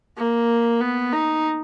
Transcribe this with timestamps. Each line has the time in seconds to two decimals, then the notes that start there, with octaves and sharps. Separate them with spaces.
0.17 A#3
0.81 B3
1.13 D#4